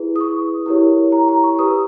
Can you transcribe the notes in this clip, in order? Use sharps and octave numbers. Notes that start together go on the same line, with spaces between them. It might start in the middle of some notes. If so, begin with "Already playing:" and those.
Already playing: E4 G#4 B4
D#6
C#6
E4 G4 A#4 C#5
A#5
A#5
C#6
G4 B4 D#6